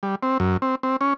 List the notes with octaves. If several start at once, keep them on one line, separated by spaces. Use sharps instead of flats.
G3
C4
F#2
C4
C4
C#4